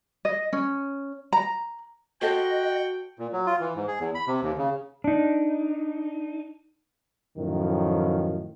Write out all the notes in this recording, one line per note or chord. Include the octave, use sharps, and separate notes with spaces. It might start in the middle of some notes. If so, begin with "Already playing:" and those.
D#5
C#4
A#5
F#4 A4 C5 D#5 F#5 G5
A#2
F#3
F4
E3
G#2
G#4
E2
B5
C3
D#2
C#3
D4 D#4
F#2 A2 D#3 F3